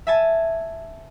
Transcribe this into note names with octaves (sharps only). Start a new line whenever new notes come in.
E5 G#5 A5